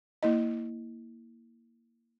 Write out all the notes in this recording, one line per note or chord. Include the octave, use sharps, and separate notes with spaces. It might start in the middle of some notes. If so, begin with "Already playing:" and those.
A#3 E4 D#5